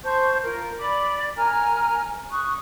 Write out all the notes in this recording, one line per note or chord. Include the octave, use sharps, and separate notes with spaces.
C5 A5 C#6 G6
F4 A#4
D5 B5 D6
A#4 G#5 A#5 F6
C#6 D#6 F#6